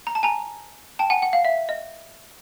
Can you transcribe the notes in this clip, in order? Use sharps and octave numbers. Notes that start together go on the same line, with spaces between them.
A#5
A5
G#5 A#5
G5 A5
F#5 G#5
F#5
F5
E5
D#5